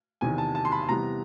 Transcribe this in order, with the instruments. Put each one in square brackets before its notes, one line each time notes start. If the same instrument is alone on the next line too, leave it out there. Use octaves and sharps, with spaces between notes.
[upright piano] E2 C3 D#3 G#5
A5
A5
C6
B5
C3 E3 G3 B3 A#5